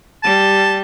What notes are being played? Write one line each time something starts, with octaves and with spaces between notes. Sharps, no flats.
G3 A5